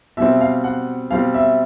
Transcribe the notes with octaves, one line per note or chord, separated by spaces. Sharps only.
B2 G3 C4 E5
F5
F#5
B2 G3 C4 F5
E5